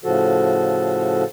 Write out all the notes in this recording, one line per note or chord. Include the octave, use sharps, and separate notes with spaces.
A2 C#3 F3 F#4 A4